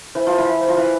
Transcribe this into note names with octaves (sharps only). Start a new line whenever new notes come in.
E3 C5
F3 C5
E3
E5
C5
F3
E3 C5